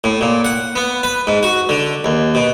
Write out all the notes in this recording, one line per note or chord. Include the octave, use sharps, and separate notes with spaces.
A2
A#2
F#5
B3
B4
G#2
F#4
D3
D#2
B2